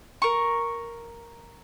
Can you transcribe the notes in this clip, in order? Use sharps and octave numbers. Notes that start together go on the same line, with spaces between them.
A#4 C#6